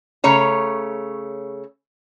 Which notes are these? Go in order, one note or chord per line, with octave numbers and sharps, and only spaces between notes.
C#3 A3 C#5 A#5